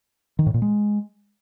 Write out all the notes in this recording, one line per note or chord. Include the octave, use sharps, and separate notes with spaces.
D#3
A2
A#2
G#3